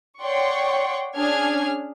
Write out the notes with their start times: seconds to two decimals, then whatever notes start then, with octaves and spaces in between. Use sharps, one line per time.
0.21 C#5 D5 F#5 G5 C6 C#6
1.17 C#4 D4 G#4 F6 G#6